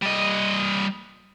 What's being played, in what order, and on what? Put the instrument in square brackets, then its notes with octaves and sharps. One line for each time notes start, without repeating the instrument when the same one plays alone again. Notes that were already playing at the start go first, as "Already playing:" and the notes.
[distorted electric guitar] G3 D#5